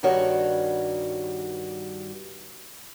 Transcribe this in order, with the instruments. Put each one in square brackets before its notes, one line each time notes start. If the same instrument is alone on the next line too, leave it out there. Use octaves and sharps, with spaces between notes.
[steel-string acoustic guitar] G2 D#3 G3 F#4 C#5